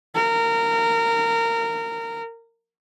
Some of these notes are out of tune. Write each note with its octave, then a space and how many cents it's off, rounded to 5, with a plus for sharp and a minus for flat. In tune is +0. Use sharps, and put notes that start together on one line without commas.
A#4 -20